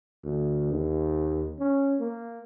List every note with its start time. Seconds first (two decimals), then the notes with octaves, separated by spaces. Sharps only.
0.24 D2
0.73 D#2
1.60 C#4
2.00 A#3